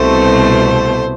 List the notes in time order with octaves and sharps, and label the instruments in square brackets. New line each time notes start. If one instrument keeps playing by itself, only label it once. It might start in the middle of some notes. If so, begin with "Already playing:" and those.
Already playing: [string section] C2 B2 A3 [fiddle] C5